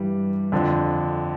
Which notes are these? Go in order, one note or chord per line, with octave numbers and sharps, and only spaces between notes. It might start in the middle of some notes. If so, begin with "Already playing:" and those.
Already playing: G2 E3 G3
F2 D3 F3